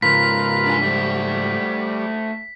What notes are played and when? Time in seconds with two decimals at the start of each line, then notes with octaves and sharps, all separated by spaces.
0.02 G#2 C#3 F4 A#4 B4 B6
0.66 D4 G#5
0.82 G3 A3 C5